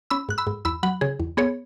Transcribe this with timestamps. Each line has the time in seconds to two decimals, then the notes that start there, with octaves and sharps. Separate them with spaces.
0.10 C#4 B5 E6
0.29 G#2 F#6
0.38 B5 E6
0.47 G#2
0.65 E2 B5 E6
0.83 F#3 F#5 B5
1.01 C#3 G#4
1.20 E2
1.37 B3 G#4 C#5